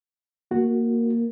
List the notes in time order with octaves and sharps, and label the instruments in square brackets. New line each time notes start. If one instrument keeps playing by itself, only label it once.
[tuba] A#3 [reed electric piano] F#4